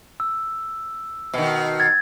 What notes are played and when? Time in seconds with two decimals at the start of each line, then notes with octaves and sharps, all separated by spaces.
0.20 E6
1.34 B2 D#3
1.80 G#6 A6